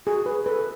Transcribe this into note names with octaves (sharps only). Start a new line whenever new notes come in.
F#4 G#4
G#4 B4
A4 B4